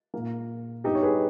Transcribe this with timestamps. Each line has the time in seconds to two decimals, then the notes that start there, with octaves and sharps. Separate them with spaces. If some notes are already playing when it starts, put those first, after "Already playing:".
0.14 A#2 A#3
0.84 G2 G3 B3 D#4 G4
0.95 C#5
1.02 G#4 B4